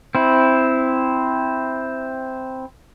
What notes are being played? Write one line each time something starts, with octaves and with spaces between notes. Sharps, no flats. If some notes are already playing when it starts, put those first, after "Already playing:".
C4 E4